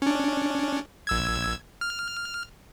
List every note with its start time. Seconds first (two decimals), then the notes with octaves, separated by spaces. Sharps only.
0.02 C#4 D4
1.07 A#1 E6 G#6
1.81 F6